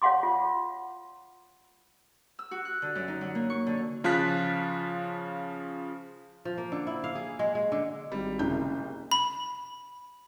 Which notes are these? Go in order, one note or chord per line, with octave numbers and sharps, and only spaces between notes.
C#5 F5 F#5 C6 D6
F4
E6
F#4
F#6
D3
F#2
D#4
F#3
A#3
C#6
D3
C#3 F3 F4 A5 F#6 B6
F3
A#3
D3
E4
F5
G#4
G#3
G#3
D3
G#1 G3
F#1 C2 C#3 G6
B5